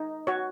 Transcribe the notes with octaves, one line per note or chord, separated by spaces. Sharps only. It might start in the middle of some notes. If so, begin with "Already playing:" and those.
Already playing: D#4
F#4 C#5